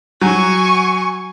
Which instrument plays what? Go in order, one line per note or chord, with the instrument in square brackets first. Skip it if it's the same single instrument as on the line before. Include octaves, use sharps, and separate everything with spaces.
[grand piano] F#3 [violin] G#5 C#6